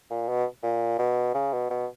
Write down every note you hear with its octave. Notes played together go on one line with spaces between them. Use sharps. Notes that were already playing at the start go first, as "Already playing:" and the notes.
A#2
B2
A#2
B2
C#3
B2
B2